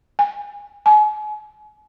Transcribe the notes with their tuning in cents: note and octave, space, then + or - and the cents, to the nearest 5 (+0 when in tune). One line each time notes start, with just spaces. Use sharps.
G#5 -25
G#5 +40